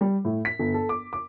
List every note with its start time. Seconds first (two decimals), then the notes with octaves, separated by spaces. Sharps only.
0.01 G3
0.25 A2
0.45 B6
0.59 G1
0.74 A4
0.89 D6
1.13 D6